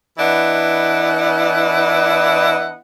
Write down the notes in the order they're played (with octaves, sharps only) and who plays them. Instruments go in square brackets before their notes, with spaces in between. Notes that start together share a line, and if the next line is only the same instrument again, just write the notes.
[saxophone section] E3 B3 D4 E4 D#5 F#5